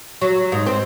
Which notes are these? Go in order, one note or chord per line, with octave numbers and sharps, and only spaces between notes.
F#3
G#2
C4